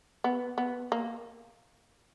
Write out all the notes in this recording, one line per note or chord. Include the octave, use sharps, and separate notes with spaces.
B3
B3
A#3